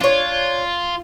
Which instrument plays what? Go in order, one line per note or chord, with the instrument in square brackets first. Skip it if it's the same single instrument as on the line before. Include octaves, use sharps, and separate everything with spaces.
[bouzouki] D4 C#5 [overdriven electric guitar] F4